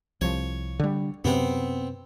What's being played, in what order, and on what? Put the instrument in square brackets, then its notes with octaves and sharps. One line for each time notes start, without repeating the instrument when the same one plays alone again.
[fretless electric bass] C2 F3 [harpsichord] C#5
[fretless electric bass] D3 G3
[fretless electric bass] F#2 C3 [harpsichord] B3 C4